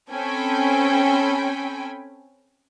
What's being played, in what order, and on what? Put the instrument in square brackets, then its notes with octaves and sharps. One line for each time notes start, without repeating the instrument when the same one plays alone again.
[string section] C4 C#4 A4 G5 G#5 B5